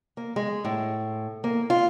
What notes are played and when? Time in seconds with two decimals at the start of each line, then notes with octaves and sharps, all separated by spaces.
0.17 A#3
0.36 G#3
0.65 A2
1.44 A#3
1.70 F4